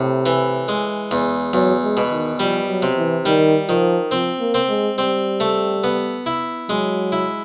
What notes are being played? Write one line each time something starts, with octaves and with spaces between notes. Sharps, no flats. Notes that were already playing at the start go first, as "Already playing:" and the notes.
Already playing: A2 C3
E3
G#3
E2
E2 F#3
G#3
B2
D#3
F3 G3
F#3
C3
E3
D#3 G3
D#3 F3
F3 C4
A#3
C4
G#3
G3 C4
A3
B3
E4
F#3 G#3
E4